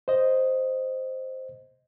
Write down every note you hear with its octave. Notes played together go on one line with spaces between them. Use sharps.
C5 D#5